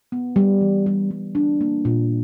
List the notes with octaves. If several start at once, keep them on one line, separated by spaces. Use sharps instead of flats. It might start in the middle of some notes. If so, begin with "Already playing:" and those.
B3
G3
E3
G3
G3
D4
A#3
A#2